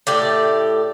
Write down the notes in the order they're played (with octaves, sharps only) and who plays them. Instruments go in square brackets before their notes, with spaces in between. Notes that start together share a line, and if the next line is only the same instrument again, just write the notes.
[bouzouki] A2 G4 D5